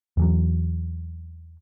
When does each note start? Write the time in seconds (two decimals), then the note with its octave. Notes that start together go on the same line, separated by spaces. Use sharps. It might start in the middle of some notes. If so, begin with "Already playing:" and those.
0.17 E2 E3 F#3